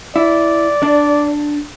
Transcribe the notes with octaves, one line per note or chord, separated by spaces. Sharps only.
E4 D5
D4